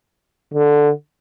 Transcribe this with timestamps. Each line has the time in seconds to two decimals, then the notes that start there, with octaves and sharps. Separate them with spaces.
0.54 D3